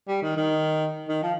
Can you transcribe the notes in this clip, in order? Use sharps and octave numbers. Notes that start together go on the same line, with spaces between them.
G3
D#3
D#3
D#3
F3